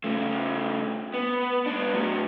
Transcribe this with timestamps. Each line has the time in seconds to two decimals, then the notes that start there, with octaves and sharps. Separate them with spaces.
0.04 C#3 A3
1.14 B3
1.66 B3 D4
1.93 A2 F#3